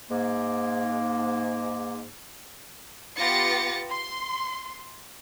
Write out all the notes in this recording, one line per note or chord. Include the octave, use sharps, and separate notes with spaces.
G#2 A#3
B3 F4 G4 A6 A#6 C#7
C6